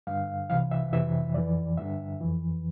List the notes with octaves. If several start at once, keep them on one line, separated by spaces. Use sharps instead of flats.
G2 D3 F5
C2 C3 E3 F5
E5
F2 C3 E3 E5
F2 E3 D5
G2 D3 E5
F2 E3